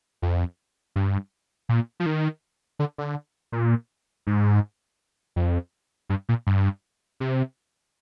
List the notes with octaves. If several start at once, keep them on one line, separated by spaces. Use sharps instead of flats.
F2
G2
A#2
F3
D#3
D3
D3
A#2
G#2
F2
G2
A#2
G2
C3